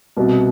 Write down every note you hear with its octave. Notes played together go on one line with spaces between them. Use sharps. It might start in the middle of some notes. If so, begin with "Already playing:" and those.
C2 B2 G3